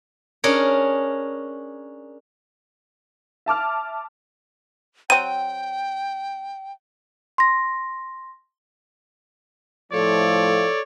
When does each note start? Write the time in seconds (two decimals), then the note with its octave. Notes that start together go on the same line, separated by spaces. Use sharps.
0.44 C#4 D4 G#4 A#4 C#5
3.46 E5 A5 D6 F6
5.10 F#3 C4 G5 D#7
7.38 C6 A#6
9.92 A2 F3 A4 C#5 D5